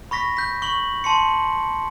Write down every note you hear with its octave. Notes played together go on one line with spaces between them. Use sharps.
B5 C#6 A#6 B6
G6 B6
C#6 F#7
A5 C6 C#7